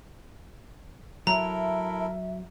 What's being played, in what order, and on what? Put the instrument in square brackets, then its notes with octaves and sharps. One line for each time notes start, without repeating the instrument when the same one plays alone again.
[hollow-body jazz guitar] F#3 [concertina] E4 A4 A#4 [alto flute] E5 [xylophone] A#5